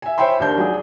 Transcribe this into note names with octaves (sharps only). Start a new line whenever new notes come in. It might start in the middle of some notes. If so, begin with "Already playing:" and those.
E5 G#5
C5 C#5 E5 G5 B5 C6
D#2 D4 A#4 G6
F#3 G#4 D5